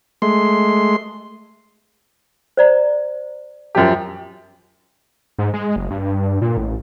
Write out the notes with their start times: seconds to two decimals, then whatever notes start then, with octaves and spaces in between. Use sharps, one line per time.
0.22 G#3 A3 C6
2.57 C5 D5 A#5
3.75 F#2 F3 G4
5.39 G#2
5.54 G#3
5.76 F#1
5.91 G2
6.42 A#2
6.57 A1